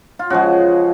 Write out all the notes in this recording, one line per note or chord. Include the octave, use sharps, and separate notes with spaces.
F4
C#3 F3 G#3 F#4